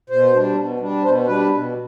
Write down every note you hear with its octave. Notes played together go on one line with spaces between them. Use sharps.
B2 C5
G3 D4
B2
G3 D4
B2 C5
G3 D4 B4
B2